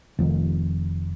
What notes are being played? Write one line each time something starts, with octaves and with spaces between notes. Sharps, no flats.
F1 F2 D#3